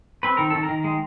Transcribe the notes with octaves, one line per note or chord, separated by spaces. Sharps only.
C4 B4
D#3 A#4
D#3 A4
A#4
D#3
G#3